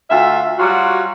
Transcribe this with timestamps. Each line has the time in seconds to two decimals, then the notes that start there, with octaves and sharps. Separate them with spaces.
0.09 D2 F4 E5
0.58 F#3 G3 F4 F#4